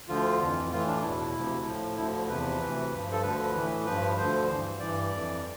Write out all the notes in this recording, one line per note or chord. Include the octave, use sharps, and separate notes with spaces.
D2 D3 F3 F4
F2 E3
A2 E3 F4
D4
E2 B2 E4
D2 C3 F3
A2 F3
D2 D3 F3 E4
E2 C3 F3 B4
D2 C3 E3
G2 F3
A4
D2 D3 F3 B4
A2 E3
G2 F3 B4
D2 D3 F3 C5
G2 E3
G2 E3 D5
F2 E3